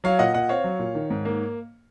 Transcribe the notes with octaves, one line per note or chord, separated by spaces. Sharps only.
F#3 C#5 F5
A#2 D#5 F#5
A#2 D#5 F#5
C4 C#5 F5
F#3
A#2
D#3
G#2
A#3